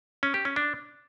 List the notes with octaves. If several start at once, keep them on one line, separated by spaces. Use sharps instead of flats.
C#4
G4
C#4
D4